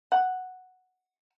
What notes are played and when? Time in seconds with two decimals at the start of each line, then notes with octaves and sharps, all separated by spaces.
0.12 F#5